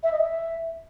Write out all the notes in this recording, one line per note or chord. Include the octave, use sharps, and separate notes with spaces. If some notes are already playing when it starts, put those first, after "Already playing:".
E5
D#5
E5